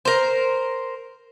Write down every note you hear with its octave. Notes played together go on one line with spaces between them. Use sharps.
A#4 C5